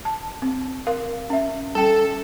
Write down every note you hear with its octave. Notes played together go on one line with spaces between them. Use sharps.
A5
C4
A#4 F5
C#4 E5
G3 C#4 A4 G5